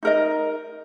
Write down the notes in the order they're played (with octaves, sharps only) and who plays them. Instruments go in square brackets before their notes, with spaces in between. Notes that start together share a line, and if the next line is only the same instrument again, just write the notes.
[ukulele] D#4 A#4 D#5